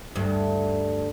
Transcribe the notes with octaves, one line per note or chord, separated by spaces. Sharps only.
D2 G2